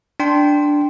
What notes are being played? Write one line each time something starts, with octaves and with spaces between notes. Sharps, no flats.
D4 G5 C6